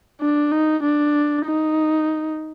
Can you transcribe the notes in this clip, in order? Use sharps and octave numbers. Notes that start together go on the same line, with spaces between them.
D4
D#4
D4
D#4